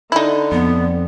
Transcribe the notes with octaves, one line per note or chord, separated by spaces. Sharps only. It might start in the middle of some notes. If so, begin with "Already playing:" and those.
D3 D#4 E4
F2 B3